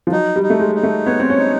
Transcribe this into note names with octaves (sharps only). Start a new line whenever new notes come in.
F3
F#3 D#4
G3
D#4
A3
G#3
D#4
A3
B3 C#5
C4
C#4
D#4